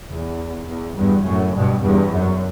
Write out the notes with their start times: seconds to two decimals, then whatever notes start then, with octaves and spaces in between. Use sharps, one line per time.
0.10 E2
0.67 E2
0.97 E2 G2
1.25 F#2 A2
1.54 G2 B2
1.83 E2 G2
2.12 F#2